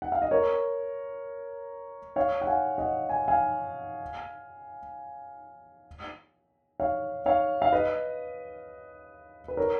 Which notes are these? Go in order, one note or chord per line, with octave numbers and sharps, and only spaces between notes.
F#5
F5
D#5
A#4 C#5
C#5 F5
F#5
F5 G#5
D#5 F#5
G#5
F5 G#5
C#5 F5
C#5 F5
F5
B4 D#5
B4
A#4 C#5